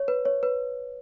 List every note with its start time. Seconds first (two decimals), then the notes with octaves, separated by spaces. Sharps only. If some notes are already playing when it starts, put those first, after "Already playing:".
Already playing: C#5
0.08 B4
0.25 C#5
0.43 B4